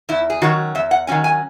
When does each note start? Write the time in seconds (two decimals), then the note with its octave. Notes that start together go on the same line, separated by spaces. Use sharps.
0.09 E2 E4
0.30 G#4
0.42 D#3 F#3 C#4 F#4
0.75 E2 E5
0.91 F#5
1.07 D#3 F#3 C#4 G#5
1.24 G#5